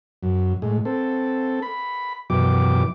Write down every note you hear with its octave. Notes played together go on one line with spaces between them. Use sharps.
F#2
A2 G#3
C4 A4
B5
F#2 B2 E3 G4 D6